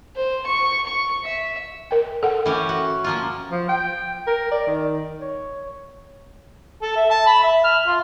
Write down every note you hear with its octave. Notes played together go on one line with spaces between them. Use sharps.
C5
C#6
C#6
E5
A#4 G5
A4 F#5
E3 C#4 G4
F#4
F3 A#3 F4
F3
G5
A#4
D5
D#3
C#5
A4
E5
A5
B5
E5
F6
F4